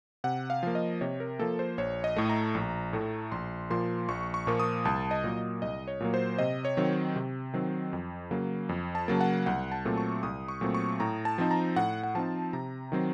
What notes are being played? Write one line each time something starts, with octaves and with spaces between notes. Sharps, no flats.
C3 F#5
F5
F3 A#3
D#5
C3 C#5
A#4
F3 A#3 A4
C5
A#1 C#5
D#5
A2 A3
A#5
A#1
A2 A3
A#1 C6
A#2 F3 A#3 C6
A#1 C#6
C#6
A#2 F3 A#3
D#6
C2 A5
D#5
A#2 F#3 A#3
C2 D#5
C#5
A#2 F#3 A#3
C5
C3 D#5
C#5
D#3 F#3 C4
C3
D#3 F#3 C4
F2
C#3 F#3 A#3
F2
A5
C#3 F#3 A#3
F#5
C2 F#5
A5
A#2 F#3 A3 C4
C#6
C2 D#6
C#6
A#2 F#3 A3 C4
C#6
A2 A#5
A5
F3 C4 D#4
A#5
A2 F#5
F#5
F3 C4 D#4 A5
C3 A#5
D#3 F#3 C4